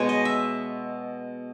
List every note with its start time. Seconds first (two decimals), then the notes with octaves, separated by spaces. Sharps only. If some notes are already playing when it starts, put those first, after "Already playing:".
Already playing: B2 G#3 B3 C#5
0.09 D#5
0.25 E5